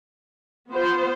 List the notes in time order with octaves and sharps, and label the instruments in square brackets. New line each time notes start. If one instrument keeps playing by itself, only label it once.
[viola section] B3 F4 C5